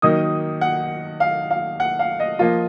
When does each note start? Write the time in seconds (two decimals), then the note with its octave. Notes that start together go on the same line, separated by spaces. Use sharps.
0.02 D#3 F#3 A#3 D#4 D#6
0.61 F#5
1.20 F5
1.51 F5
1.80 F#5
1.99 F5
2.20 D#5
2.39 F3 A#3 F4